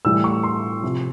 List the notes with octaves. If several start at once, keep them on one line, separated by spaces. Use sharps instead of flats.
A2 E3 G3 E6
C#6
C6
C3 F3